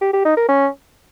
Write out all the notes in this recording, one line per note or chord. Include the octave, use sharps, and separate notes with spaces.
G4
G4
D#4
A#4
C#4